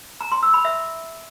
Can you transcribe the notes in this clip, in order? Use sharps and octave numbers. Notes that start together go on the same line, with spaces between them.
A#5
C6
E6
B5
E5